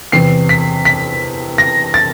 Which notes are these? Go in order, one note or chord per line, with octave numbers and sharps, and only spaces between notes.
E2 C3 E3 C7
B6
B6
A#6
A6